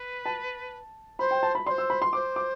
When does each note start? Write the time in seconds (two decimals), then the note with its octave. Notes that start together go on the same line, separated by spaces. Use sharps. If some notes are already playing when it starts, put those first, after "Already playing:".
Already playing: B4
0.26 A5
1.19 C5 B5
1.31 G5
1.43 A5
1.55 B5
1.66 C5 D5 C6
1.78 E6
1.90 B5
2.02 C6
2.13 C5 D6
2.36 D6